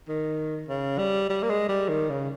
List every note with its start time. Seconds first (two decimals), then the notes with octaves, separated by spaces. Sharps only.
0.08 D#3
0.69 C#3
0.98 G3
1.30 G3
1.43 A#3
1.50 G#3
1.68 G3
1.89 D#3
2.10 C#3